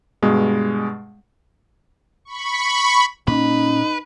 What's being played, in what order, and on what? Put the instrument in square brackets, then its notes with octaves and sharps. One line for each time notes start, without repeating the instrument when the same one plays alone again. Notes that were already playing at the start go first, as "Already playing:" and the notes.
[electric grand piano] G2 B2 G#3
[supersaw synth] B5 C#6
[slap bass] A#2 A#3 [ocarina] C#4 [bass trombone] D#4 [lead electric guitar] B4